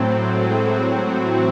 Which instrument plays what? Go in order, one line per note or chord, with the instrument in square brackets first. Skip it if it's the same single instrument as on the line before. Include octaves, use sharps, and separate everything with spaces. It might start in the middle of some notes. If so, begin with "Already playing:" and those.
Already playing: [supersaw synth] A2 F#3 C4 [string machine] A3 A4
[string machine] G#3 G#4
F#3 F#4
E3 E4